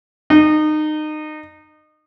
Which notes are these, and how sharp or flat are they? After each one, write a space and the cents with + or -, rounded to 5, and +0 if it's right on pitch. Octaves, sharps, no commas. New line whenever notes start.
D#4 -25